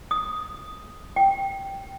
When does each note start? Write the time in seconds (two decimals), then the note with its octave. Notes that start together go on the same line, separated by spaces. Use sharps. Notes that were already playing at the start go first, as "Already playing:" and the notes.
0.11 D#6
1.16 G5